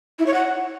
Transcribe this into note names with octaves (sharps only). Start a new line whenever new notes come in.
E4
C#5
F#5